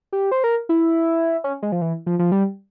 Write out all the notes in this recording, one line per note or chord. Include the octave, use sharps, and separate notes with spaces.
G4
C5
A#4
E4
C#4
G#3
F3
E3
F3
F3
G3